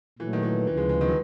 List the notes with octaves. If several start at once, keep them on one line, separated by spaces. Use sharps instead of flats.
A#2 E3 F#3 A3
D#3
E3
D2 C#3 E3 F3
G#3
G#3
D#3
F#3